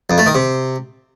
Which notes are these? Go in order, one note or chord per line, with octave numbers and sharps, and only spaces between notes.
F2
A3
D#3
C3